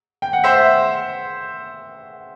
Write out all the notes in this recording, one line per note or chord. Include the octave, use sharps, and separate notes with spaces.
G5
F#5
C5 E5